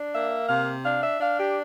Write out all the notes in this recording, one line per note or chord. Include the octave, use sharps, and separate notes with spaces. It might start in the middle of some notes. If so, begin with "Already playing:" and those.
Already playing: D4
A#3 E5
C3 F5
D4 F5
E5
D4 F5
G4